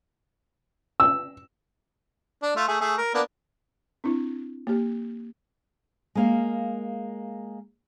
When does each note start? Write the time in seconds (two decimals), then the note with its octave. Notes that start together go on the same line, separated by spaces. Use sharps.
1.00 E6
2.42 D4
2.56 A3 F4
2.68 A3 G#4
2.81 A3 G#4
2.98 A#4
3.14 A#3 B3 D4
4.04 C4 D4 E4
4.67 A#3 G4
6.15 G#3 A#3 F5